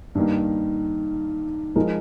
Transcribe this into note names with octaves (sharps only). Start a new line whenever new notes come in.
G2 D#3 A#3
F3 G#3 D#4 A#4